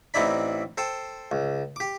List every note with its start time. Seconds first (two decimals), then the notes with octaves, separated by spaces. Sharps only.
0.14 A1 C4 D#4 E4 D5 B5
0.78 A4 C5 G5 A5
1.31 C#2
1.76 G4 D6